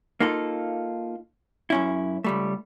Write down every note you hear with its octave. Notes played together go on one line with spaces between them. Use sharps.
A#3 D#4 F4 A4
F#2 C#4 E4
C#2 G3 A3